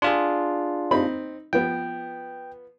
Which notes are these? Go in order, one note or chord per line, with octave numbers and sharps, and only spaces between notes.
D4 F4 G#4 C6
C4 D#4 B5
F3 B3 G5